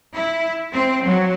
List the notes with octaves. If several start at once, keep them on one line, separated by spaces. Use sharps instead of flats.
E4
C4
F#3